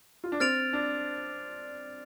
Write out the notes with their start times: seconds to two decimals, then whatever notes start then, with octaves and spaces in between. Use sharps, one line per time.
0.24 F4
0.32 D4
0.40 C4 F6 A6 D7 F7
0.73 D4